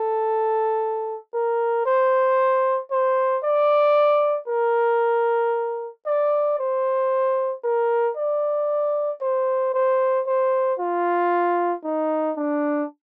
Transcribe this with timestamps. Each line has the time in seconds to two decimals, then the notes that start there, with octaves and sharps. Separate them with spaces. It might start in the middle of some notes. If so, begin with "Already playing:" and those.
Already playing: A4
1.34 A#4
1.86 C5
2.91 C5
3.44 D5
4.48 A#4
6.07 D5
6.59 C5
7.64 A#4
8.17 D5
9.22 C5
9.74 C5
10.27 C5
10.79 F4
11.84 D#4
12.37 D4